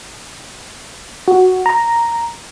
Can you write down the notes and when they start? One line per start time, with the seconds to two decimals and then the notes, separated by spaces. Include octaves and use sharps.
1.28 F#4
1.66 A#5